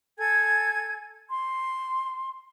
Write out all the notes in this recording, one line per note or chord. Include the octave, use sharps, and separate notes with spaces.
A4 G#5 G#6
C6